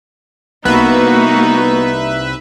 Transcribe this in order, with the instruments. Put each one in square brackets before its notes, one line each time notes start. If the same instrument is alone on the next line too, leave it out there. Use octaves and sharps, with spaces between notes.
[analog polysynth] C2 B4 E5 [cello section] A#3 F#4 [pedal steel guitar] B3 [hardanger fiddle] D#4